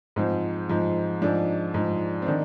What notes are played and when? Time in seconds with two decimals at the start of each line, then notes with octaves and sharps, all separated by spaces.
0.16 G#2 F3 C4
0.69 G#2 F3
1.22 G#2 F3 D4
1.74 G#2 F3
2.22 C4
2.27 D#3 D4